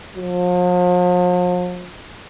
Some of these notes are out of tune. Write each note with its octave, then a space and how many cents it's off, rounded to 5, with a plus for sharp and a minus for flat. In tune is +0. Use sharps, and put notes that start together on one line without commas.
F3 +45